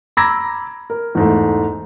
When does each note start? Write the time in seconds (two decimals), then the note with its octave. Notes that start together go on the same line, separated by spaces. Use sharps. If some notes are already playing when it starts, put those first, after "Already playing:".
0.17 A#5 B5 D6 E6 G#6 A#6
0.90 A#4
1.15 E2 G#2 A3